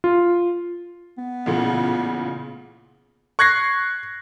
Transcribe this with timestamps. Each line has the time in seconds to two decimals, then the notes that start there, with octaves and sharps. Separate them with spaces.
0.04 F4
1.18 B3
1.46 A1 A#2 C#3
3.39 C#6 F#6 G#6 A#6 C7